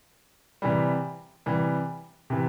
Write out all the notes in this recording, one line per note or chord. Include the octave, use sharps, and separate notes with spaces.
C3 E3 G3
C3 E3 G3
C3 E3